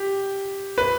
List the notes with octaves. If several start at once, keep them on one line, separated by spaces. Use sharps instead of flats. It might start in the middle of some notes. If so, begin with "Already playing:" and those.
Already playing: G4
B4